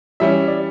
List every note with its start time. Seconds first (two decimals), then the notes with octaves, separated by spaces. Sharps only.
0.20 E3 G3 C#4 E5
0.48 D5